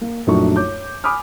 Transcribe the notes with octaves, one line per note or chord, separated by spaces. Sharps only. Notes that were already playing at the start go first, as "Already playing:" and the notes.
A#3
A#1 F#2 A3 D4 D#4 C#6
C#5 D6 G6
G#5 B5 D6 D#6 F6